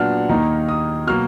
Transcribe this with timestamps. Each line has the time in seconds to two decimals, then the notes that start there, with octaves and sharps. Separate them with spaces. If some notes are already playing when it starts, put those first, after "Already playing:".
Already playing: A#2 F#3 B3 D4 F#5 F6
0.29 D#2 D#3 A#3 D#4
0.69 D#6
1.07 B2 F#3 A#3 F6